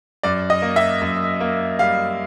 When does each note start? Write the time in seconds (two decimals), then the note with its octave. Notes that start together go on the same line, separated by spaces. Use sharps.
0.23 F#2 D5
0.50 D#5
0.62 A#3
0.76 E5
1.01 F#2
1.40 A#3
1.79 G3 F5